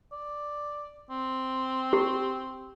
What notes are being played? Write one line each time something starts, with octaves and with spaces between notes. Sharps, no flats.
D5
C4
G4